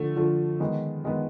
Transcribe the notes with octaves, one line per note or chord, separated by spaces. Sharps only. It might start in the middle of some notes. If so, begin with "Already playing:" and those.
Already playing: D3 F3 A3
D3 F3 A3
D#3 G#3 B3
D#3 G#3 B3